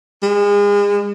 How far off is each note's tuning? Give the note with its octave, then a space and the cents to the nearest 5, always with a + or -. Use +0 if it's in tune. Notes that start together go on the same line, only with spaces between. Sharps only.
G#3 -35